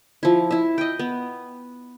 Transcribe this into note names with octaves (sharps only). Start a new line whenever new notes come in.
F3 E4
E4 E5
D#5 G5
B3